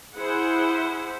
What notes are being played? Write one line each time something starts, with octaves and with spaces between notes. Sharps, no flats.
E4 G#4 C5 F#5